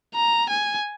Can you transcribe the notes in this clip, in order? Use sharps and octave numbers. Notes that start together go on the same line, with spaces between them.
A#5
G#5